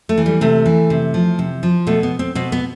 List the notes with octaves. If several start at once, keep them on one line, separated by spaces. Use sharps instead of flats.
A3
E3
G3
C3 A3
E3
C3
F3
C3
F3
B2 A3
B3
C4
B2 C4
B3